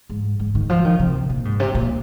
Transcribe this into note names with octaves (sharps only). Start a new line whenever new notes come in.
G#2
G#2
D#3
F3
D#3
C3
A#2
G#2
C3
A#2